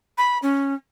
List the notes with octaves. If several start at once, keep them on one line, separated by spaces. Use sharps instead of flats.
B5
C#4